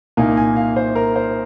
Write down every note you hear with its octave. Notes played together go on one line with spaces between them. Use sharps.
C2 A#2 A#3 D#4 G#5
G#5
F5
C5
A#4
C5